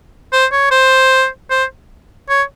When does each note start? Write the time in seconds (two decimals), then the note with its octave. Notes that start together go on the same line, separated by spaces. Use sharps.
0.32 C5
0.52 C#5
0.71 C5
1.50 C5
2.29 C#5